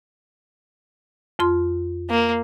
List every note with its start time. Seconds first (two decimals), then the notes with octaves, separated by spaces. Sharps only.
1.39 F2 F4 C6
2.10 A#3